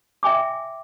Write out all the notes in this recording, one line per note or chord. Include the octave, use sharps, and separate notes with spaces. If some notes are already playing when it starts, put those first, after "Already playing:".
E5 G5 G#5 D6